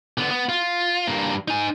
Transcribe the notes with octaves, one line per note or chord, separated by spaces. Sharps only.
D3 B3
B3
F4
G2 A#3
D#4 G#5